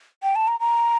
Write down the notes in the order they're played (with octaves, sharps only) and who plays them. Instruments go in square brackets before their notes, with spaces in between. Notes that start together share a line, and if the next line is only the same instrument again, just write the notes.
[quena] G5
A5
A#5
A#5